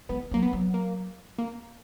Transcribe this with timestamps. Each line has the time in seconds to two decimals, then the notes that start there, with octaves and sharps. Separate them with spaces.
0.09 G#3 B3
0.31 F#3
0.34 A#3
0.42 B3
0.53 F#3
0.74 A#3
1.38 A#3